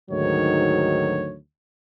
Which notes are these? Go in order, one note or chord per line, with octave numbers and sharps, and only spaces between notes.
D2 G#2 D#3 F#3 C#5